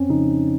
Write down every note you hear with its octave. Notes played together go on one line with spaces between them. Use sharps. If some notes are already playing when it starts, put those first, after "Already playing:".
Already playing: F2 C4 C#4
C#3 F3 D#4